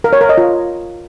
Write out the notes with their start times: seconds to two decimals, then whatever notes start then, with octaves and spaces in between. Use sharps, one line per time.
0.04 A#4
0.13 C#5
0.21 A#4
0.29 D#5
0.38 F4